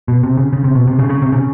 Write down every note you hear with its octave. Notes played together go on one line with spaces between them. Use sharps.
B2
C3
C#3
C#3
C3
B2
C3
C#3
C#3
C3
C#3